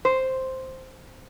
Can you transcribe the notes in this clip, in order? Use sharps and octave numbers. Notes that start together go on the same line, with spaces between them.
C5